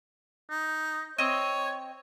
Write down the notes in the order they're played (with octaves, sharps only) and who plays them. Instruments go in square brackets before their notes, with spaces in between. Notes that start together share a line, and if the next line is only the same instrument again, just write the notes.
[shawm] D#4
[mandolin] C4 D#5 [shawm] C#5